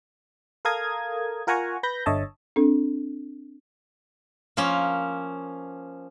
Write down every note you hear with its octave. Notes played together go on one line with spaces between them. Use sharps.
A4 A#4 F5 A#5 D#6 G#6
F4 A#4 F#5 G#5 A#5 C#6
B4 B5 G6 A#6
G1 D3 C#5 D#5 E5 A5
C4 D4 A4
F3 A#3 C#4